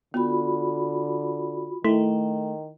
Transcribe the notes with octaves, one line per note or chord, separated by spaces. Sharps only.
D3 B3 F4 F#4 B5
D#3 A3 E4